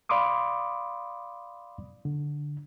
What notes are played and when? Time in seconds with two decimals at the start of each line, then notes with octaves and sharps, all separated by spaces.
0.09 D5 F5 B5 C6 D6 D#6
2.05 D3